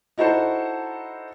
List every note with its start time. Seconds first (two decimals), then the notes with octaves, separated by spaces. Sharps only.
0.18 D#4 E4 F#4 A4 C5 A5